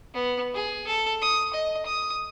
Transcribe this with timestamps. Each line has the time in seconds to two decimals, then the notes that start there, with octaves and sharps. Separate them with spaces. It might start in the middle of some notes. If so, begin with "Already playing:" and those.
0.14 B3
0.55 G#4
0.87 A4
1.22 D#6
1.53 D#5
1.86 D#6